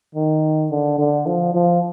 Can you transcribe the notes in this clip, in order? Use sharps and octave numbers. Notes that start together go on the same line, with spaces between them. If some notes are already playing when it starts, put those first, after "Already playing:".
D#3
D3
D3
F3
F3